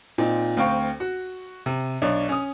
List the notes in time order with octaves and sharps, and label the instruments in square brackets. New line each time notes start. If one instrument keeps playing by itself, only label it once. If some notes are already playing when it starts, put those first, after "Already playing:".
[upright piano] A#2 C4 D#4
D2 C4 F5 G5 C#6
F#4
C3
B1 D4 C#5
C#4 D#6